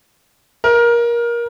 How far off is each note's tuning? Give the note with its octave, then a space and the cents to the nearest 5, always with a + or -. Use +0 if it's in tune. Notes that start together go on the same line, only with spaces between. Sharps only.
A#4 +20